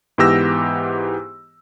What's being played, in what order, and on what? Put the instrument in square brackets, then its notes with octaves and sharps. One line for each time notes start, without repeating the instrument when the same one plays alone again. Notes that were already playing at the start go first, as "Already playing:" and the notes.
[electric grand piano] G#2 E3 B3 G4 E6 A#6